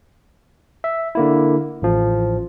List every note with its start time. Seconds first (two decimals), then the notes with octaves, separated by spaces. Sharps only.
0.84 E5
1.15 D3 A#3 E4
1.82 A1 F3